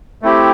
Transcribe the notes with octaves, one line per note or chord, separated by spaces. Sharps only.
A3 C4 E4 G4